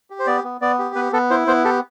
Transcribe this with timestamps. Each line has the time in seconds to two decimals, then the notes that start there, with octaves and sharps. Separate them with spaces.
0.10 G4
0.20 C5
0.27 B3 D5
0.44 B3
0.61 B3 D5
0.79 G4
0.95 B3 B4
1.13 B3 A4
1.30 E4 C5
1.47 B3 C5
1.64 G4 A4